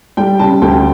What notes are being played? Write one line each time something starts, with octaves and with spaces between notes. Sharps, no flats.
G3 G5
C#3 A5
D2 G5